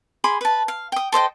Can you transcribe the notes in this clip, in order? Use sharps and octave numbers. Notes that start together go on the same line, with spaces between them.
G#4 B5 C6 D6
B4 A5
F5
G5 D#6
A4 C5 D#5 G5